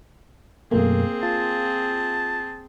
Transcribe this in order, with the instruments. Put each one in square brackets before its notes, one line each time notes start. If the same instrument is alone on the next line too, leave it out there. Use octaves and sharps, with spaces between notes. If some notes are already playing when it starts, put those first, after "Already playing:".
[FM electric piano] F#2 B2 A3 [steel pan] A#3 [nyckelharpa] C4 G#4
[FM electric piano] F4 [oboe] A5